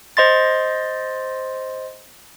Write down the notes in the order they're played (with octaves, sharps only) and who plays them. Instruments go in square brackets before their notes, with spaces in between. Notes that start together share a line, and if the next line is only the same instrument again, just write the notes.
[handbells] C5 D#5 C6 A6